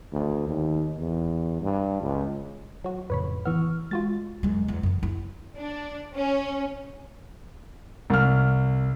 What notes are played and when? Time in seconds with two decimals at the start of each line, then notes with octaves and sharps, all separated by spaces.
0.12 D2
0.48 D#2
0.99 E2
1.61 G2
2.01 C#2
2.84 F#3 F#4
3.10 F2 A2 C#3 B4 C#5 B5
3.45 E3 B3 C#6 E6 F6
3.91 G#3 F4 F#4 A6
4.43 F#2 G#3
4.68 E2
4.83 F#2 E3
5.03 E4
5.56 D4
6.15 C#4
8.10 C2 F6